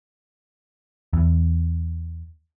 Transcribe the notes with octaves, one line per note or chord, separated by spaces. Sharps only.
E2